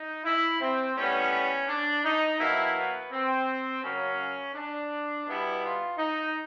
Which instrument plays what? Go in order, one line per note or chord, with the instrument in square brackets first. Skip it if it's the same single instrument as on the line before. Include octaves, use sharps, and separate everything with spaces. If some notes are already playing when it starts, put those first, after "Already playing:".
Already playing: [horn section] D#4
E4
C4
A2 E3 G3 B3 C#4
D4
D#4
B2 F#3 A#3 E4
B3
C4
C#3 F#3 A#3 C#4
D4
B2 G3 B3 E4
F4
D#4